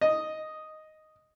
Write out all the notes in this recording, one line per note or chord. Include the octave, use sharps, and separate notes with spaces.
D#5